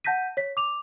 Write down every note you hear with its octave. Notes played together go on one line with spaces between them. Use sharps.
F#5 A5 G6 A#6 B6 D#7
C#5 B6
D6 F7